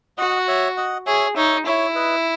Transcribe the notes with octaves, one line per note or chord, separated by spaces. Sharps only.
F#4 D#5 F#5
F#5
C#5 E5
D#5 F#5
G#4 C#5 E5
D#4 C#5 E5
E4 C#5 E5
B4 D#5